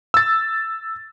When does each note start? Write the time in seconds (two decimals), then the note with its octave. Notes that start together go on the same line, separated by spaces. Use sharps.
0.14 E6 A6